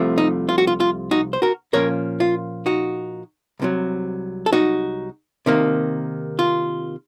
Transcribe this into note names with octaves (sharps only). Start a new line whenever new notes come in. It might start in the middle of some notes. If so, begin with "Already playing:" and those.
Already playing: C2 C3 F3 A3
D#4
F4
F#4
F4
F4
D#4 F#4
C5
F#4 A#4
A#2 F3 A#3 C#4 A#4 C#5
F4
D#4 F#4
C2 C3 D#3 F#3
A4
D#4 F#4
C3 D#3 A#3
F4